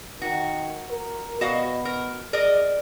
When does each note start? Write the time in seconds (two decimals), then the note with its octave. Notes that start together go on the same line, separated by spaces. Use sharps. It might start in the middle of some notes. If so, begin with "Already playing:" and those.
0.22 D#3 F#4
0.90 A#4
1.41 B2 F#4 D#5 F5
1.85 A#4
2.33 G#4 A#4 D5 D#5